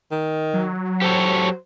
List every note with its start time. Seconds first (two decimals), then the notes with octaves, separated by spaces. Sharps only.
0.12 D#3
0.54 F#3
1.02 G4 A4 C5 C#5